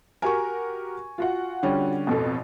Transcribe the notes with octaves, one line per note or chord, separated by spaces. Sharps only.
F#4 G4 A#4 G#5 C#6
F4 F#4 F#5
D3 G3 C#4
A1 F2 B2 A4